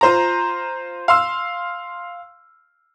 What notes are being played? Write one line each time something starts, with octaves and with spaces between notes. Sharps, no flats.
F4 C5 A#5
F5 C6 E6